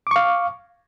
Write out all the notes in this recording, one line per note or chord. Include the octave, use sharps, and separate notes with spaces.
F5 C#6 D6